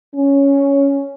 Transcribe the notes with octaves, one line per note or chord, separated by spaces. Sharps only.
C#4